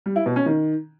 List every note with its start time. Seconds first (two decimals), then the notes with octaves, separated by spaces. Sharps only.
0.06 G3
0.16 E4
0.26 B2
0.36 C#4
0.46 D#3